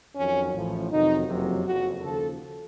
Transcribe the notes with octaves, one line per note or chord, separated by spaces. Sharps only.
F2 D#3 F#3 C#4
A1 A2 F3
F2 C3 D#3 F#3 D#4
F#1 F2 C3 F#3
F#1 F2 C#3 F#4
D#2 C#3 F3 A4